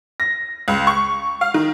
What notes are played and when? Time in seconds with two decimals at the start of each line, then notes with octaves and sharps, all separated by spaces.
0.20 A#6
0.68 C#2
0.87 C#6
1.41 F5
1.54 D#3